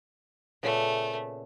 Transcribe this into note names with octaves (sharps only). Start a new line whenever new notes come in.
A#2 C#3 A3 B3